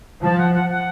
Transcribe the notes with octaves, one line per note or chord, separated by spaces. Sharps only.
F3 A5
F#5
F#5
F#5